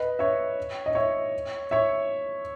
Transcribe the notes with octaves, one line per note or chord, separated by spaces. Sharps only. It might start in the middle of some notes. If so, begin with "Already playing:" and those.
Already playing: B4 D#5
C#5 E5
D#5
C#5 E5
C#5 E5